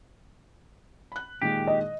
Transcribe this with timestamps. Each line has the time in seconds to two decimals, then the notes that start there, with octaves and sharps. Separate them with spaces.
1.12 B5 F#6
1.42 A#2 D#3 G#3 G4
1.67 D#5